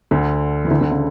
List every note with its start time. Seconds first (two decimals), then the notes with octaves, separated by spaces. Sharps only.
0.11 D2 D3
0.65 E3
0.71 D2 D3
0.81 D2 D3
0.91 C#3